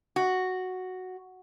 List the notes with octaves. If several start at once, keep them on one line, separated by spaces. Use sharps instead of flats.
F#4